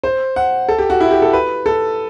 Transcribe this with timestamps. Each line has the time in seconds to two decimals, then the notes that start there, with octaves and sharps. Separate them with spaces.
0.04 C5
0.36 F#5
0.69 A4
0.79 G4
0.90 F#4
1.01 E4
1.11 G4
1.22 A4
1.33 B4
1.66 A4